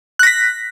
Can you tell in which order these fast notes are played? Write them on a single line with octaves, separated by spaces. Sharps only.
F#6 A#6 B6